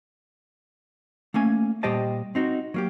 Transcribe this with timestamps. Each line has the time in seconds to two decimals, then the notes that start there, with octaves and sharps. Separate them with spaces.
1.34 A3 A#3 C#4 G#5
1.83 A#2 G3 G4 C5 D#5 A5
2.35 C4 D#4 F#4
2.74 F#3 A#3 G4